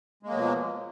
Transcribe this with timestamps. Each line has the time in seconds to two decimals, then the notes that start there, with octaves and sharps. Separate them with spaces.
0.23 G#3
0.26 A#3
0.30 F#3
0.34 B2
0.37 F3